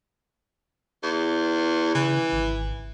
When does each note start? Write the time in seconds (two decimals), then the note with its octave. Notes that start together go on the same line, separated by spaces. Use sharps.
1.03 E2
1.95 C#3 E3
2.32 G#1